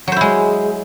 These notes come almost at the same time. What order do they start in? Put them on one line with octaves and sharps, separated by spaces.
F#3 C5 E4 G#3